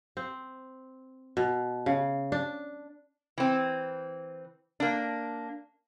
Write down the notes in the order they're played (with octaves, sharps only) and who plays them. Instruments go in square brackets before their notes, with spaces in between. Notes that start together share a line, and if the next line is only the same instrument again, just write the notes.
[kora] C4
B2
C#3
D4
[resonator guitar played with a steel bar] E3 C4
A#3 D4